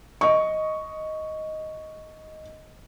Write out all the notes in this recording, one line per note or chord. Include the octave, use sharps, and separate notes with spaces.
D#5 C#6